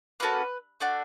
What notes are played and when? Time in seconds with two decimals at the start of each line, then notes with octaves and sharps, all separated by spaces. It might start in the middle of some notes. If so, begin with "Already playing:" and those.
0.20 A#3 C#4 F#4 A4 B4
0.80 A3 D4 F#4